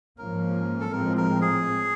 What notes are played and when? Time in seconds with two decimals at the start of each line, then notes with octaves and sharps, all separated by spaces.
0.18 G#2 F3 A#3 C#4 A#4
0.80 A4
0.92 A2 F3 G#3 C4 A#4
1.17 A#4
1.41 G#4